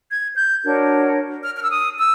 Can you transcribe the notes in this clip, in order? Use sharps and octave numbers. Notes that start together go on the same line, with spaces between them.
G#6
G6
D4 F#4 A#4 C#5
F6
F6
E6
D#6
E6